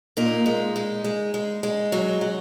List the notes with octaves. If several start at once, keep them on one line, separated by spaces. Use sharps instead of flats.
A#2 A#3 D#4
G#3
G#3
G#3
G#3
G#3
F#3
F#3